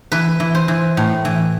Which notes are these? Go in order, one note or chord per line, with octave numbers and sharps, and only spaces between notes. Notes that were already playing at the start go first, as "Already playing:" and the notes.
E3 B4
E3
C5
E3
A2
E3